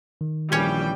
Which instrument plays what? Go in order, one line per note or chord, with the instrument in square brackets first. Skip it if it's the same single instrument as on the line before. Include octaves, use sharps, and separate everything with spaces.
[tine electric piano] D#3
[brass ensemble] A#1 E3 G5 [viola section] G3 [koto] C#4 C#5